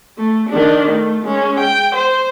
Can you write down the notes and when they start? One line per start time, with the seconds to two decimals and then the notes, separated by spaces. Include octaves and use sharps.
0.18 A3
0.50 D#3 D4
0.92 A3
1.23 G#3 C#4
1.60 G5
1.95 C5